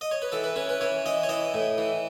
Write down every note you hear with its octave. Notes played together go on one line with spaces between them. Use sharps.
D#5
C#5
B4
E3 A4
B4
C#4 B4
B4
E3 C#5
E3 D#5
C#5
E3 D#5
A2
E3